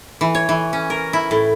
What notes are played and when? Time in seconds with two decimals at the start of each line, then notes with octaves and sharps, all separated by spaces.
0.21 E3
0.35 C#5
0.49 E3
0.73 C#4
0.90 A#4
1.13 E4
1.31 A2